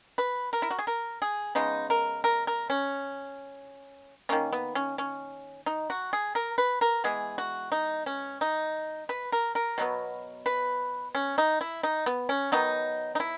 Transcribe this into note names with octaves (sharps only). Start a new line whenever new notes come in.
B4
A#4
E4
F#4
G#4
A#4
G#4
C#3 G#3 B3 D#4
A#4
A#4
A#4
C#4
D#3 A#3 C#4
B3
C#4
C#4
D#4
F#4
G#4
A#4
B4
A#4
E3 G#3 B3 G#4
F#4
D#4
C#4
D#4
B4
A#4
A#4
B2 F#3 B3
B4
C#4
D#4
E4
D#4
B3
C#4
D#3 F#3 B3 D#4
D#4
E4